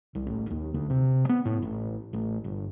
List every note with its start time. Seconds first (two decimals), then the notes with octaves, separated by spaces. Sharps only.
0.15 C2
0.27 A1
0.50 D#2
0.74 D2
0.90 C3
1.29 B3
1.45 A2
1.62 A1
2.13 A1
2.44 G1